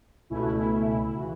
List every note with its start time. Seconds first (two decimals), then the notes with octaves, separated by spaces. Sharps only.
0.30 C#2 B2 A3 C#4 E4
0.39 F#4
0.43 E4
0.58 E4
1.04 E4
1.14 C#3 E3 F#4